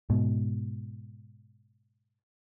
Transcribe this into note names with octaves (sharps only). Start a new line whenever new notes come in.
G#2 B2